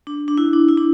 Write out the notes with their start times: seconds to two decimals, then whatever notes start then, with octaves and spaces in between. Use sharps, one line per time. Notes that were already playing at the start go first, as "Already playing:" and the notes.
0.07 D4
0.28 D4
0.38 E4
0.53 D4
0.68 E4
0.78 D4